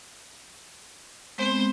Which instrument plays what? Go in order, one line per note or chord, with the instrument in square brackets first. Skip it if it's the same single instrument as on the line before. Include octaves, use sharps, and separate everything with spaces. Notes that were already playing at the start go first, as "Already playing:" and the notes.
[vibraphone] G#3 B3 C4 [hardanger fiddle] C5